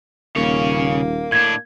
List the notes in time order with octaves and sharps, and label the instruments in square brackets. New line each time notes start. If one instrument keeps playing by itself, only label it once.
[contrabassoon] D#1 [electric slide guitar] C#3 C#5 [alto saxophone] A#3
[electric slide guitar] A2 D4 [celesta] G#6